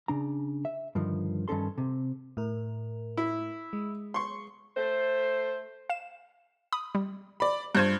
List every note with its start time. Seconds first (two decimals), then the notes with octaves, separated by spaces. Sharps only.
0.08 C#3 D4 A#5
0.65 E5
0.95 G2 D3 D#3 F3
1.48 G2 D#3 C#4 A4 C6
1.78 C3
2.37 A2 A#4
3.17 E4
3.73 G#3
4.14 C6 C#6
4.77 A3 C5
5.90 F5 E7
6.72 B5 D#6
6.95 G3
7.40 D5 B5
7.75 G2 F4 C5 F#6 G#6